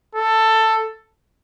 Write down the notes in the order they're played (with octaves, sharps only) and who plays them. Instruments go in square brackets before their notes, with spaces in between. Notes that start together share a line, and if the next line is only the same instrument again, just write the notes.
[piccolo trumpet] A4